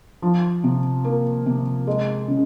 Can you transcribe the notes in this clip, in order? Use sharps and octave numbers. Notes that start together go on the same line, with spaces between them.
F3
C3
A#3
C3
G#3
C#3